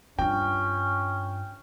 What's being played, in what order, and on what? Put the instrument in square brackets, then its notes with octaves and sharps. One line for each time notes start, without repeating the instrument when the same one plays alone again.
[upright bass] G2 F4 [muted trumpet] C#4 [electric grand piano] G5